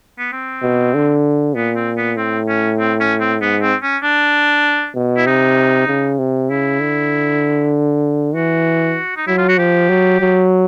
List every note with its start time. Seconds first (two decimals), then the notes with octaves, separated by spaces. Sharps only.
0.18 B3
0.32 C4
0.63 B2
0.94 D3
1.56 A#2 B3
1.76 C4
1.97 B3
2.17 A2 C4
2.48 C#4
2.79 C4
3.00 C#4
3.20 C4
3.41 G#2 B3
3.61 C4
3.83 C#4
4.03 D4
4.95 B2
5.17 E4
5.26 C3 D#4
5.88 C#3
6.19 C3
6.50 C#3 E4
6.80 D3
8.35 E3 F#4
9.17 D#4
9.27 F#3 E4
9.38 F4
9.49 F#4
9.58 F3 G4
9.90 F#3
10.21 F#3